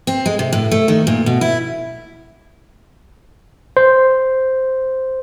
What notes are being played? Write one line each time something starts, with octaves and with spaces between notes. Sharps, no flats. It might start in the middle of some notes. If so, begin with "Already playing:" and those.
C4
G#3
C3
A2
A3
D#3
A#2
B2
E4
C5